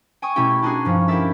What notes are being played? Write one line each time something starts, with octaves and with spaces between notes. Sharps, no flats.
G5 G#5 C#6 D#6
B2 A3 C#4 E4 G4 G5
D4 D#4 F#4 G#4
G2 F3 C#4
E4 G4 A4 A#4 D5 E5